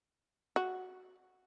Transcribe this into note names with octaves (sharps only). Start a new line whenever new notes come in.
F#4